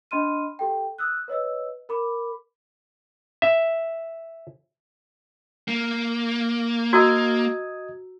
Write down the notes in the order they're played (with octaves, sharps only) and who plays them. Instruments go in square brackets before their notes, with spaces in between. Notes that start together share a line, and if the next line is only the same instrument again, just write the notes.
[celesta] D4 D#5 B5 C6 F6 D#7
G4 A4 G5
D#6 E6 F#6
B4 C#5 D#5 E6
A#4 B5 D6
[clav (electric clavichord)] E5
[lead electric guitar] A#3
[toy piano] F#4 A#5 E6 [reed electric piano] D#5 D#6 G#6